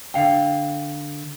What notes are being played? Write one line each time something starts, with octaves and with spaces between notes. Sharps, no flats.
D3 F5 G5